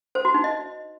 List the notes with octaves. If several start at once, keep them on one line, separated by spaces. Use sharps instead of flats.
C5
F#4
D#4
D#5